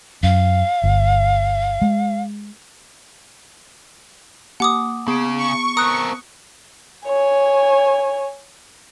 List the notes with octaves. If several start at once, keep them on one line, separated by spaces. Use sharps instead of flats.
F#2 F5
G1
G#3
A#3 F#5 D6 D#6
C#3 B3 D7
C#6
C4 A#4 D#6 F#6
C#5 G#5